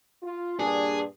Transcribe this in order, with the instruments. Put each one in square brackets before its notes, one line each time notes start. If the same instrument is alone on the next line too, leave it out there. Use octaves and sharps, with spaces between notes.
[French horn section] F4
[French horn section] G2 A#2 [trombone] D4 [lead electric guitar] G#4